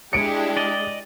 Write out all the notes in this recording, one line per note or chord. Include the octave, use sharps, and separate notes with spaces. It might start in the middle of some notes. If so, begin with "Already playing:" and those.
G#3 D4 E4 G4 C#7 D7
D5 D#5